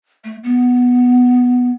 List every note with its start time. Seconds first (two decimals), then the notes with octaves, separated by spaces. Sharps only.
0.24 A3
0.44 B3